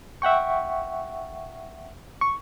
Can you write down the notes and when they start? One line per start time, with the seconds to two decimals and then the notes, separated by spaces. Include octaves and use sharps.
0.22 E5 F#5 G5 C#6
2.21 C#6